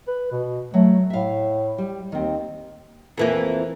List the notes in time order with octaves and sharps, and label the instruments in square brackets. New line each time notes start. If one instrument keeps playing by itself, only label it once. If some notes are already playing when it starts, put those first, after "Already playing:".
[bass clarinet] B4
B2
[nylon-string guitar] F#3 [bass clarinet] A3
[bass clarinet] A2 [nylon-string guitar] E5 F5
[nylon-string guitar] G3
[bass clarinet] D#2 [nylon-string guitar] D#3 C4
[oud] F2 E3 A#3